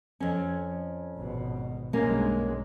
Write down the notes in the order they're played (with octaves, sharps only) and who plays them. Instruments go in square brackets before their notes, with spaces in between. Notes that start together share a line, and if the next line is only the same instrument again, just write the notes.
[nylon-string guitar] F2 C#4
[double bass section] G#1 B2
[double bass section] B1 G2 G#3 [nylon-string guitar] A#3 C#4